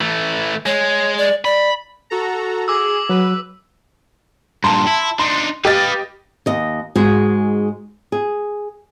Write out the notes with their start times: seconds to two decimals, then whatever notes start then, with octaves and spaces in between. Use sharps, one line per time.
0.01 E3 A3
0.66 G#3 C#5
1.18 D5
1.45 D5 B5
2.10 F#4 A4 A#5
2.68 G#4 D6 E6
3.09 F#3 B4
4.64 G2 A#2 A5 C6
4.87 E4
5.19 D4 D#4 C6
5.65 G4 B4 D#5 F5 A6
6.46 D#2 D#5
6.95 G#2 G#3 F#4 G#4
8.12 G#4